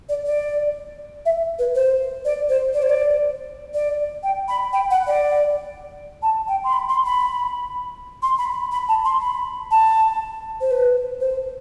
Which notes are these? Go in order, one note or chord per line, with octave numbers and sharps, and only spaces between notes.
D5
D5
E5
B4
C5
D5
C5
D5
C5
D5
D5
G5
B5
G5
F#5
D5
A5
G5
C6
B5
C6
B5
C6
B5
B5
A5
C6
B5
A5
C5
B4
C5